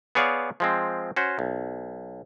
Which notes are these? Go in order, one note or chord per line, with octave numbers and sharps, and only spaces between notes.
B3 G#4 C#5 D5 F5
F3 G#3 C4
C#4 F#4 C5
B1